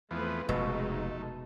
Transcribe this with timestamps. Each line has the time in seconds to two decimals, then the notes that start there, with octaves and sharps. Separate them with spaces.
0.11 E2 F3 A3 B3 C4 B4
0.49 F1 B2 G#3 A3 D#4